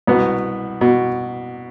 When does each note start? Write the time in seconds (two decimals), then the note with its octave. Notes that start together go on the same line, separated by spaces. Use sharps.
0.07 C2 B2 B3
0.81 B2